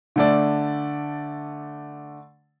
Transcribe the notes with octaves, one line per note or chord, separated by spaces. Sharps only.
D3 A3 D5